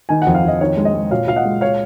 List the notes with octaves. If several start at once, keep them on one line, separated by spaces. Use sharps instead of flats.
D#3 G#5
F2 F#5
F5
F2 D#5
D#3 C#5
G#3
D#5
G#3
A#2 C#5 F5
A#2 F5
D#5 F#5
G#3
C#5 F5